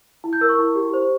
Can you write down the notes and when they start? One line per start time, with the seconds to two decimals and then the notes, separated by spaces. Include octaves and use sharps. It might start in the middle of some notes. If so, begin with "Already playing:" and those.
0.24 E4
0.33 G6
0.41 A#4 E6
0.49 C#6
0.59 E4
0.75 G4
0.93 C5